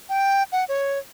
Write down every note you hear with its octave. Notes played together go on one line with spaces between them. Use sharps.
G5
F#5
C#5